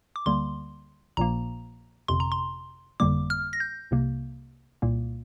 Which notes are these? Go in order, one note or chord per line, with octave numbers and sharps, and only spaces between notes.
D6
D2 D3 G3 A#3 C6
A#1 A#2 F3 A#3 A#5
G1 F2 C3 C6
A#5
C6
G1 F2 D3 G3 A#3 D6
F6
A#6
G6
C2 C3 A#3
C2 A#2 A#3